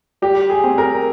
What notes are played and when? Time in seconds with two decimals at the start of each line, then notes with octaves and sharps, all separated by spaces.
0.22 G3 G4
0.50 G#4
0.64 C4
0.78 A#4